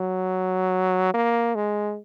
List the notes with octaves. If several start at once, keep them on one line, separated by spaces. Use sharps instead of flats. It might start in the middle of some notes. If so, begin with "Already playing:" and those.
Already playing: F#3
A#3
G#3